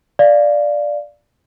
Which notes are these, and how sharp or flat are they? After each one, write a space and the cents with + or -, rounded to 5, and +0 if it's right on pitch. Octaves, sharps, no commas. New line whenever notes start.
D5 +0 F5 +0